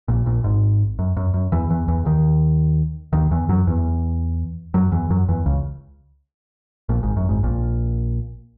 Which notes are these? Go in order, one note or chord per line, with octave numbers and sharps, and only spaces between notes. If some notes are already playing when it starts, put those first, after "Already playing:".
A#1 A#2
A#1 A#2
G#1 G#2
F#2
F#2
F#2
E2 E3
E2 E3
E2 E3
D#2 D#3
D#2 D#3
E2 E3
F#2 F#3
E2 E3
F#2 F#3
E2 E3
F#2 F#3
E2 E3
C#2 C#3
A#1 A#2
G#1 G#2
F#2
G#1 G#2
A#1 A#2